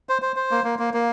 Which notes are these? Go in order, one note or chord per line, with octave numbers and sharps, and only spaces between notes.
C5
C5
C5
A#3
A#3
A#3
A#3